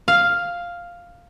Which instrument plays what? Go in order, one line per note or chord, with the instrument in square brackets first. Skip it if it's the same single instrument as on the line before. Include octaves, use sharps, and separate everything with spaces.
[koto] F5